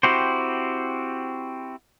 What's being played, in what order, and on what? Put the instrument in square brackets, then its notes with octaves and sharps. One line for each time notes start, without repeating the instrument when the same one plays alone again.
[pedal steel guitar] C4 E4 F#4 G4 C5